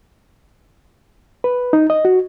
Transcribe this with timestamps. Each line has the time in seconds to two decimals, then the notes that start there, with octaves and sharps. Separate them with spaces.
1.44 B4
1.73 D#4
1.90 D#5
2.05 F#4